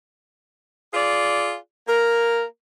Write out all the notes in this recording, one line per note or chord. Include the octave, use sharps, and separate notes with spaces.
F4 G#4 D5
A#3 A#4